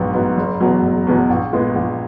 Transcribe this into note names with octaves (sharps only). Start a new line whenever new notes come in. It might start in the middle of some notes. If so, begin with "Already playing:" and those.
Already playing: A#1 G#2 F#3 B3
G#2 F#3 B3
F#1
E2 B2 F#3
F#1
E2 B2 F#3
A#1
A#2 G#3 B3
A#1